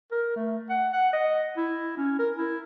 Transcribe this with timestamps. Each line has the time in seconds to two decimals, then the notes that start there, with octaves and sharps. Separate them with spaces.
0.12 A#4
0.36 A3
0.70 F#5
0.93 F#5
1.13 D#5
1.57 E4
1.97 C#4
2.19 A#4
2.36 E4